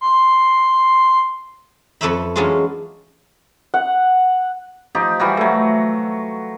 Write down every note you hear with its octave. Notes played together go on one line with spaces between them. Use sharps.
C6
F2 A4 B4 C#5 E5 B5
E3 F#3 G#3 C#4 D4 F4
F#5
F3 D#4 G4
E3 G3 F#4
F#3 A3